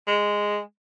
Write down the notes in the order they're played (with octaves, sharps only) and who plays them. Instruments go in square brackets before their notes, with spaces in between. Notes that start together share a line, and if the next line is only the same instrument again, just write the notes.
[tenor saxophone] G#3